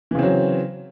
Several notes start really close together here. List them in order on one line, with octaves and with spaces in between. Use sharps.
E3 C#3 C4 F#3